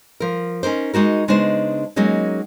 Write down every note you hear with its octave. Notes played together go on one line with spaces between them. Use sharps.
F3 A#4
C#4 D#4 A#4 C5
G#3 D#4 F#4 A#4
C#3 G#3 B3 D4 D#4 C5
F#3 G#3 A#3 C#4 D#4